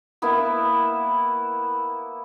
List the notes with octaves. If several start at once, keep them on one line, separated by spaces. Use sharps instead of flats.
A#3 B3 E4